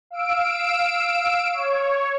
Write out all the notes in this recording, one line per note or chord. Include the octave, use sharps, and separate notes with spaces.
F5 E6 D7
C#5